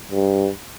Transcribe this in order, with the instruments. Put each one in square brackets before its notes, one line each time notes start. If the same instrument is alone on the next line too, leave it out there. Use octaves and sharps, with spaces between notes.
[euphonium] G2